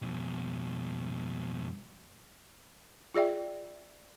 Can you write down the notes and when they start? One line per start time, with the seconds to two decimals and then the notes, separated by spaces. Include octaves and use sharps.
0.02 F2 B2
3.14 F4 G#4 D5 E5 G5